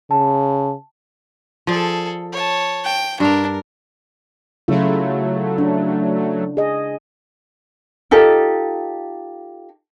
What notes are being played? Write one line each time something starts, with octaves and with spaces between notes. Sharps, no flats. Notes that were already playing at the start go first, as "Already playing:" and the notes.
C#3 A5
F3 G#4 A4 D5
C#5 A5
G5
G2 D4 A#4 F5
C#3 F#3 A3 E4 F4
D4
G#4 D#5
D#4 F4 G4 A4